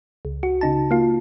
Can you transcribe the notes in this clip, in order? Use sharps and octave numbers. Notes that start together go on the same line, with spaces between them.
C#2
F#4
C#3 D#4 A5
A#3 F4